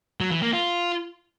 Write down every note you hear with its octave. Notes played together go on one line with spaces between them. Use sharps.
F#3
E3
A#3
F4